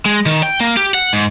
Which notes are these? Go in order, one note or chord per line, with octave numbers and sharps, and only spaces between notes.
G#3
D#3
G5
A#3
G4
F#5
G#2